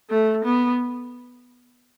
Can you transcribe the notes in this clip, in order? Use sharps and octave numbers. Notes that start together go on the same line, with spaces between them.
A3
B3